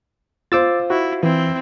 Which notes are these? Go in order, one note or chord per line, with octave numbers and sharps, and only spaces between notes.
F4 C5 D6 E6 A6
E4 F#4
E3 C4 E4